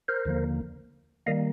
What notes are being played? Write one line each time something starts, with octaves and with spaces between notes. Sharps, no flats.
A#4 C5
D#2 D3 F3 A#3
D#3 G3 A#3 D#5 F5